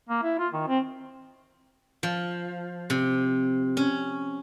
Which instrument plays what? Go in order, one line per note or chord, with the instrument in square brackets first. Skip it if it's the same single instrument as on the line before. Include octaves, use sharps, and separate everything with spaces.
[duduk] A#3
E4
F4
D#3
C4
[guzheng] F3
C3
C#4